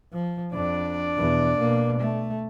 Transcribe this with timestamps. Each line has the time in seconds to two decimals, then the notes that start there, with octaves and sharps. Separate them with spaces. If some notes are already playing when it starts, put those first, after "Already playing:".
0.13 F3
0.52 F2 D4 D5
1.17 E2 B2
1.59 B2 A#3
2.00 A3